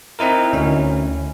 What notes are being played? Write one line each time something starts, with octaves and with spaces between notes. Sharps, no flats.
C4 D#4 E4 A#4
D2 C#4